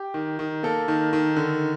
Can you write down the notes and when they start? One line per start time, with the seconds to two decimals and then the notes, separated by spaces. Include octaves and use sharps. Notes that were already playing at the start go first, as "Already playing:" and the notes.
Already playing: G4
0.14 D#3
0.39 D#3
0.63 A#3 A4
0.88 D#3
1.13 D#3
1.37 D3